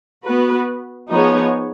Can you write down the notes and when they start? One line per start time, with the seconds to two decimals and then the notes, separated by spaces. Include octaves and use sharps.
0.24 B3 F#4 B4
1.09 F3 B3 D#4 G#4 C#5